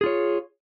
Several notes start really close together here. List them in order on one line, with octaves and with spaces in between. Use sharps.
G#4 F4 C#5